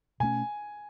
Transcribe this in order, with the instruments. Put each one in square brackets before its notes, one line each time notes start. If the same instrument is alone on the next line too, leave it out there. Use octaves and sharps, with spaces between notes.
[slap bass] B2 A3 C#4 [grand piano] G#5